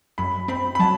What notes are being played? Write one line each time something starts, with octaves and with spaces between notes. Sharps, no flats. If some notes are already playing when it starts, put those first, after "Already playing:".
F#2 B5
C4 B5
B5
F#3 A5